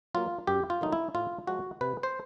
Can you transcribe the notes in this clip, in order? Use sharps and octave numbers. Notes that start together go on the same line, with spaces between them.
F#3 A#3 F4
F#2 G4
F4
D#3 F#3 A3 D#4
E4
A2 F4
F3 G#3 F#4
C3 B4
C5